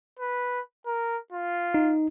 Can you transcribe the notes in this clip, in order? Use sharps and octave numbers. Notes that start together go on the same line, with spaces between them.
B4
A#4
F4
D#4